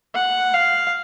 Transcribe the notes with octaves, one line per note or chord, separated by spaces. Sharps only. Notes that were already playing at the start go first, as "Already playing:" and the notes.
F#5
F5